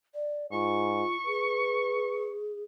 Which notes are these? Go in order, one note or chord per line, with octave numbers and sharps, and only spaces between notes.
D5
G#2 F4 C#6
G#4 B4